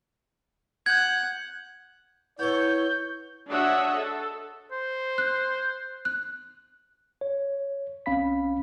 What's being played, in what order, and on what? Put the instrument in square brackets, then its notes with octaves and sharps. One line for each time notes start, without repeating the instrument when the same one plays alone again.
[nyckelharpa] F#5 [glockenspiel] G6 G#6
[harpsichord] B3 A4 [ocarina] E4 [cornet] C#5 [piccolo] G6
[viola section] D4 F#4 C#5 D#5 E5 F#5
A4
[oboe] C5
[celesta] F#6
F#6
[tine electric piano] C#5
B1 C4 C#4 F5 B5 B6